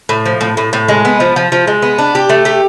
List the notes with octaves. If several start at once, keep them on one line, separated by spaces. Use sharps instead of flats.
A2
F3
A2
A2
A2
G#3
B3
F3
F3
F3
G#3
B3
D4
G4
A3
G4